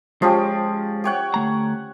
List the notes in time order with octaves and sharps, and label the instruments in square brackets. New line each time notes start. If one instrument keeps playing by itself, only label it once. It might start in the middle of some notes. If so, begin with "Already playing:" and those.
[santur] F3 C#4 G4 [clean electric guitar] G#3
[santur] G4 C#5 F#5
[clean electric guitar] D2 A3 A#5